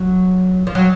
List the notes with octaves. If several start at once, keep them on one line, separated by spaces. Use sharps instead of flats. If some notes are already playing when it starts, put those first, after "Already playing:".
Already playing: F#3
F3
F#3